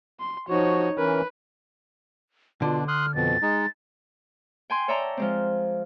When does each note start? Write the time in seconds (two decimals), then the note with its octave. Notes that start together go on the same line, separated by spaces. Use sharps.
0.20 C6
0.49 F3 D#4 F#4 C#5
0.98 E3 C#4 A#4 B4
2.62 B2 D3 D4 F4
2.88 C6 D#6 F6 F#6
3.15 F2 B2 A6
3.42 G#3 D#4
4.70 G5 G#5 C6
4.88 C#5 D5 E5 G5 A5 A#5
5.17 F3 G#3 C4